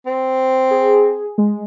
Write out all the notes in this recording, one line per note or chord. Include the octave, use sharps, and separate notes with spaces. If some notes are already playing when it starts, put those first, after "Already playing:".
C4
G#4
G#3